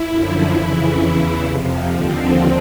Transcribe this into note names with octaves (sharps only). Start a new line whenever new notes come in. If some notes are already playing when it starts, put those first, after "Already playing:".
Already playing: E4
F#2 D3 F3
F2 C#3 E3
E2 C#3 E3
F2 C3 F3
D#2 D3 F3 C4